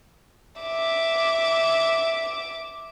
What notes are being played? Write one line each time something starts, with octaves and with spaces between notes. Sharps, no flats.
E5 D6